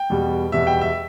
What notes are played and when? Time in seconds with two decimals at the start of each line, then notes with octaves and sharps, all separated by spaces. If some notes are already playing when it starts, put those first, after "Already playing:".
Already playing: G5
0.10 E2 B2 G3
0.52 E2 B2 G3 E5
0.67 G5
0.81 E5